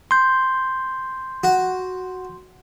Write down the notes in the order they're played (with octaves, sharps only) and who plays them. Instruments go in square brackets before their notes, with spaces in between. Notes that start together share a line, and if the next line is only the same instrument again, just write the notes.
[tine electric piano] C6 G6
[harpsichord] F#4